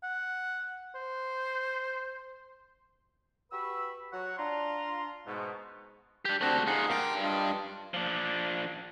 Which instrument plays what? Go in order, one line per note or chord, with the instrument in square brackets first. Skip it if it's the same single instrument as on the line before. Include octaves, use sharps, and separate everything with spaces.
[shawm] F#5
C5
[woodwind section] F#4 G4 B4 B5 C#6 E6
F#3 F#4 C#5 F#5
D4 F4 A#5 C6
G#2 B2 G#3 A3
[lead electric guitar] D4 G4
[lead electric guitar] A3 F#4 [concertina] C4 D4
[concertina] D#4 G#4 [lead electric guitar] F4 F#5
[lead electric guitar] G2 G5 [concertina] A#4 C6 D6
[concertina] D4 F4 D#5
[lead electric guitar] F3 D4